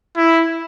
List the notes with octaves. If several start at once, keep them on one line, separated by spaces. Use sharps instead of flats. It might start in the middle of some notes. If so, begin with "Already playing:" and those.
E4